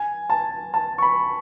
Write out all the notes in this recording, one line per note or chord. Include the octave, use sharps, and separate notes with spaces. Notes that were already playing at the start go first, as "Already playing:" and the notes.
Already playing: G#5
A5
A5
C#6
B5